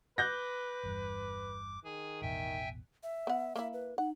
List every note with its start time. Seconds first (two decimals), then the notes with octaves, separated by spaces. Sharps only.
0.18 B4 D6 F#6 G6 A#6
0.83 G1 E2 G2
1.85 D#3 G#4 G#5
2.22 A1 E2 B2 E5 G5 G#5
3.03 E5
3.27 B3 F#5
3.56 A#3 E4 E5
3.73 B4
3.98 D#4 F#5